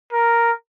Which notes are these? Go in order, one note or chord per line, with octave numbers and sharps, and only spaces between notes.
A#4